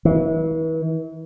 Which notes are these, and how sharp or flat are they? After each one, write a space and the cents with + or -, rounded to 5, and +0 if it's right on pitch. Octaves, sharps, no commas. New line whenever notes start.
E3 -35